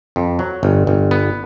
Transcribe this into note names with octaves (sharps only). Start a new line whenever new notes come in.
F2
F#3
G1
G1
B3